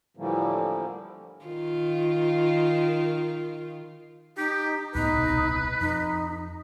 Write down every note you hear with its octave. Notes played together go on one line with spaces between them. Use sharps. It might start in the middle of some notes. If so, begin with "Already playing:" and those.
A2 D3 E3 F3 G3 A#3
D#3 F4
D#4 G4
C#2 A2 B3 D#4 B4
D#1 C2 B2
F2 D#4